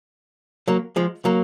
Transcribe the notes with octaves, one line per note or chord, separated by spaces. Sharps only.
F#3 A#3
F3 G#3
F#3 A#3